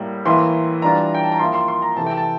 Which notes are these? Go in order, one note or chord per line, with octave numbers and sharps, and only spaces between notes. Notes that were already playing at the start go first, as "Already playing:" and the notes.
Already playing: A2 G3 A#3
A2 E3 A#3 E4 C6
E3 G3 D4 F4 A#5
G5
A5
A#5
F3 A#3 E4 C6
C6
C6
A#5
C3 E3 A3 A5
G5
A5